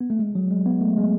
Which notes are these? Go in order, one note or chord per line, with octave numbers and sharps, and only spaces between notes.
B3
A3
G#3
F#3
G#3
B3
A3
G#3